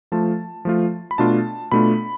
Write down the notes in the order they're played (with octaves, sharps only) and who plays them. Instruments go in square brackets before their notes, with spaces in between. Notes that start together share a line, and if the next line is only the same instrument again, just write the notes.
[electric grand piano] F3 A3 F4 A5
F3 A3 F4
B5
B2 A3 D4 F4 A5
B2 A3 D4 F4 B5